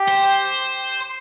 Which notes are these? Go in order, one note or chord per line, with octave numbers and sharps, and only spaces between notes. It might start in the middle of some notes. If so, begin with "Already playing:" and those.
Already playing: G4
C5